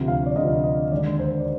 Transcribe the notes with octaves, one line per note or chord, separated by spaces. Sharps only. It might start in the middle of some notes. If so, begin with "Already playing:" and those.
Already playing: D2 C3 F3
F5
D5
D2 C3 F3 D#5
D#5
D#2 D3 G#3 D5
C5
D5